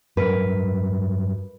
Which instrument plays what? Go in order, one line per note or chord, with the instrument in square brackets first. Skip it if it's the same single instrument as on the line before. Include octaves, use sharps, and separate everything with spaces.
[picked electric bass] G2 F#3 [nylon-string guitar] A#4 B4